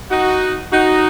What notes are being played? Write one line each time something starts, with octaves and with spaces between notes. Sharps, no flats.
D#4 F#4
D#4 F#4